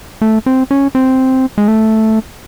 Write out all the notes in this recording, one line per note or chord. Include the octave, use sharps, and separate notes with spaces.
A3
C4
C#4
C4
G#3
A3